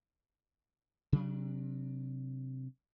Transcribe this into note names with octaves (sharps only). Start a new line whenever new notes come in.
C3 F#3 D4